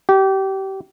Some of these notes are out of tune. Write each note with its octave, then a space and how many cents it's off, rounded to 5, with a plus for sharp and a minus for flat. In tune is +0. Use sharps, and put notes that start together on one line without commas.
G4 -30